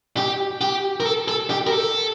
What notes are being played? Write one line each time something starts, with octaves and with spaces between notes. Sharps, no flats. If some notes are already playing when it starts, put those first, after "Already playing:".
G4
G4
A#4
A4
A4
G4
A#4
A4